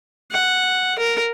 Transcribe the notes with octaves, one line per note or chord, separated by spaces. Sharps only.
F#5
A#4